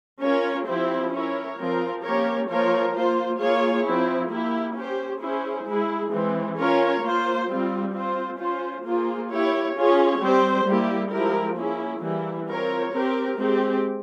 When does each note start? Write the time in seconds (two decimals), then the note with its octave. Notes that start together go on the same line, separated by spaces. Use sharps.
0.21 C#4 F4 A#4 C#5
0.67 F3 C4 E4 G4 C5
1.12 C#4 E4 A#4 C#5
1.58 F3 C4 F4 A#4
2.03 A#3 C#4 G4 A#4 C#5
2.49 F3 A#3 F4 A#4 C#5
2.94 A#3 F4 C5
3.39 A#3 F4 G#4 C#5
3.84 F3 C4 E4
4.30 A#3 E4 G4
4.75 C#4 G4 C5
5.21 C#4 E4 G#4 C5
5.66 G#3 E4 G#4
6.11 E3 G#3 C4
6.56 C#4 F4 A#4 C#5
7.02 A#3 F4 C5
7.48 G3 C4 F4
7.93 C4 F4 C5
8.39 C#4 F4 C5
8.84 A#3 F4 G#4 C5
9.30 A#3 E4 G4 C#5
9.75 C#4 F4 G#4 C#5
10.20 G3 C4 G4 C5
10.66 G3 A#3 E4 G4
11.10 F3 G#3 E4 G4 A#4
11.56 A#3 C#4 E4 G#4
12.01 E3 G3 A#3 E4
12.47 C4 F4 A#4 C#5
12.92 C4 G4 A#4
13.38 G#3 C4 G4